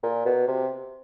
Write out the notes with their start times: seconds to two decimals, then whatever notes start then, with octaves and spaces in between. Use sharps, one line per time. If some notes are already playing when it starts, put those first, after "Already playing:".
0.03 A#2
0.25 B2
0.48 C3